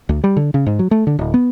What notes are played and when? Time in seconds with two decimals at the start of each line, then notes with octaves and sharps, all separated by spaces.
0.09 D2
0.24 G3
0.37 D3
0.54 C#3
0.66 G#2
0.79 F#3
0.91 A3
1.07 D3
1.19 D1
1.34 B3